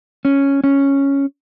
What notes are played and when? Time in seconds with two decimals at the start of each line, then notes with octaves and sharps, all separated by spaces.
0.25 C#4
0.64 C#4